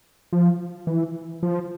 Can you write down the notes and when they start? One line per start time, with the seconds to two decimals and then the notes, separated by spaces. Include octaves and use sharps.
0.33 F3
0.87 E3
1.43 F3